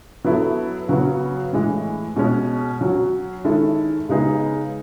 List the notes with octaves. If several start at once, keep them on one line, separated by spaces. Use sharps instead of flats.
F#3 B3 E4 A4
C#3 F#3 B3 F#4
A2 E3 G#3
B2 G#3 C#4
F#3 C#4 F#4
D#3 G#3 C#4 E4 A4
C#3 G#3 B3 D#4 G#4